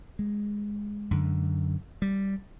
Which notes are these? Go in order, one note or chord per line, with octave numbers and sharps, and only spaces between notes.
G#3
F#2 D3
G3